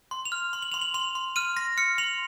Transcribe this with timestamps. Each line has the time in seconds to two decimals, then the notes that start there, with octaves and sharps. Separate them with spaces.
0.11 C6
0.25 F7
0.32 F6
0.53 C6
0.62 F#7
0.72 C6 F7
0.81 F#7
0.94 C6 F7
1.15 C6
1.36 F6 D#7
1.57 C6 A#6
1.78 F6 C#7
1.98 C6 F7